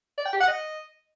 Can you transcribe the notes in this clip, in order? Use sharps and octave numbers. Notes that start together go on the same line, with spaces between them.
D5
G5
G4
F#5
D#5